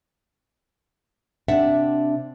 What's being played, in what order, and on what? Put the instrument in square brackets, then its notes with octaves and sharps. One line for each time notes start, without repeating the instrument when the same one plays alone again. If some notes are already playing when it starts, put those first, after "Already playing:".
[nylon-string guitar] C3 D4 E5 F#5